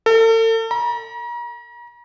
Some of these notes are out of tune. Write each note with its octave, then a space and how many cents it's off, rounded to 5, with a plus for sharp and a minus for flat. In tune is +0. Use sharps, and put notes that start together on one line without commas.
A4 +40
A#5 +40